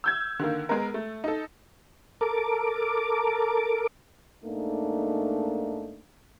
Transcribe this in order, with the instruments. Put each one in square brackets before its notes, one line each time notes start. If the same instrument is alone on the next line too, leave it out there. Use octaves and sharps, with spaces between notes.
[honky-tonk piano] E6 G6 G#6
D3 D#3 A#3
G#3 B3 A#4
A3
D#4 A4
[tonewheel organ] A4 A#4 D6
[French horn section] G#2 A3 A#3 D4 D#4